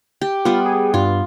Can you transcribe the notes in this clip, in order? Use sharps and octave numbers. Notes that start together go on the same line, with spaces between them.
G4
G3 B3 F4
G#4
G2 F4